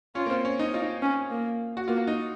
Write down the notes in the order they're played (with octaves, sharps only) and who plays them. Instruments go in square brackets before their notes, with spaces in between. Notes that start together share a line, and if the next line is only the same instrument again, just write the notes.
[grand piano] C#4 [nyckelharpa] F4
[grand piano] A#3
C4
C#4
D#4
[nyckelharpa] D#4 [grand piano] F4
[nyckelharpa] C#4
A#3
[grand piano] F#4
[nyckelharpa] A#3 [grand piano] F4
[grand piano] D#4